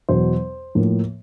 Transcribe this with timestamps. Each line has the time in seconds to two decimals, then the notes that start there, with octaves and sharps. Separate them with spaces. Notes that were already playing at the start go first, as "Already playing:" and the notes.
0.09 E2 B2 F#3 C5
0.75 A2 F3 A#3